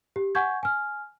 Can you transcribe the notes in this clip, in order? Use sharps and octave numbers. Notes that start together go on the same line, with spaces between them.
G4
F#5 G#5 C#6 G6 G#6
G#5 F6